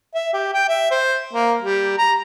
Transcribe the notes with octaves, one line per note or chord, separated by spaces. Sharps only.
E5
G4
G5
E5
C5
A#3
G3
A#5